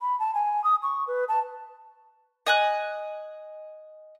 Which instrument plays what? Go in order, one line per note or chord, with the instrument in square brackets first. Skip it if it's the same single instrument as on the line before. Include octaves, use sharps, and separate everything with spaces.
[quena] B5
A5
G#5
D#6
C#6
B4
A5
[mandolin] D#5 G#5 F#6